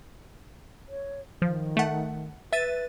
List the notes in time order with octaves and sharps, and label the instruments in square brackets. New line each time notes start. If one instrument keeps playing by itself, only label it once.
[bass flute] C#5
[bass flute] D#3 [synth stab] F3
[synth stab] A3 F#5
[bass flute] B4 [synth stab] E5 A6 D#7